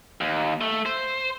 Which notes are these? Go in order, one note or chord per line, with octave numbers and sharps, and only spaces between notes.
D#2
A3
C5